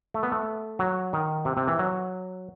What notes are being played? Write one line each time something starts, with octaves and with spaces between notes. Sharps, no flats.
A3
B3
A3
F#3
D#3
C3
C3
E3
F#3